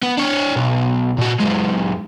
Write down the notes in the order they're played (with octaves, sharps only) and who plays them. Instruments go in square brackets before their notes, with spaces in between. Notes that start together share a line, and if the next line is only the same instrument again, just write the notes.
[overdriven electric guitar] B3
D4 C#5
B1
A#2 F#4
F#2 G#3